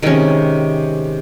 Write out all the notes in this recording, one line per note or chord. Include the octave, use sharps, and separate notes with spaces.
C3 D#3 G#3 C#4